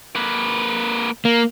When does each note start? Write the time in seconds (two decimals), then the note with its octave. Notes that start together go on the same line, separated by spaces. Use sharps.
0.15 A#3 B4
1.25 A#3